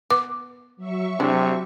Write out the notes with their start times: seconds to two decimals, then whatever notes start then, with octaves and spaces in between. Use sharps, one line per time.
0.10 B3 D6
0.77 F#3 E5 C#6
1.20 C3 G#3 D4 E4